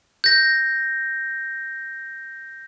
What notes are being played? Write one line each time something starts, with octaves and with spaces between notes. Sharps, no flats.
G6 A#6